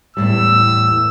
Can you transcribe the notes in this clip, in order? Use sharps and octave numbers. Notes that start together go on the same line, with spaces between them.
E2 A2 G3 E6